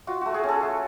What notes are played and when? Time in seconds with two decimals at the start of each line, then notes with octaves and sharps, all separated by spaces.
0.07 F4 F#4
0.21 A3 F#4
0.34 G#4
0.44 C#4
0.49 A4
0.62 A3